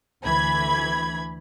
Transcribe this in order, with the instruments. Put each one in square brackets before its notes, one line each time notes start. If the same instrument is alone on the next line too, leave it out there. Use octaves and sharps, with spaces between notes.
[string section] D2 E3 B5 G#6